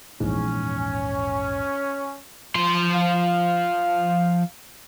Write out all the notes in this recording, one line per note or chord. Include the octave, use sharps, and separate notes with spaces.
A#1 E2 G#2 C#4
F3 C6
F5